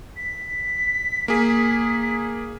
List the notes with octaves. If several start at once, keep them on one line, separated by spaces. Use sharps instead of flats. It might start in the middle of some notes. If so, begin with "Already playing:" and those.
B6
A#3 G#4